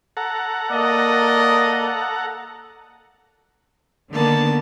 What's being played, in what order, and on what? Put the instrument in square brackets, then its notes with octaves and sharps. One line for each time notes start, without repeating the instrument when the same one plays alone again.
[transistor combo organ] A4 F#5 A#5
[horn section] A#3 D5 D#5
[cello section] D3 D#3 B3 [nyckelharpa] A#3 A5